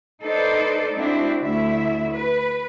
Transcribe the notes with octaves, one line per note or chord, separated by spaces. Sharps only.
D#4 A4 B4 C5 D5
G#3 C4 D4 E4 F#4
D2 E4 E5
B4